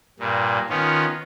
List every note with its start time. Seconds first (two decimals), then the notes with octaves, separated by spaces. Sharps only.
0.19 G2 A#2
0.70 D#3 B3 C#4 F4